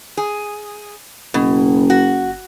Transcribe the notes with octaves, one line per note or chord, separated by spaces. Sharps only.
G#4
F#1 B2
F#4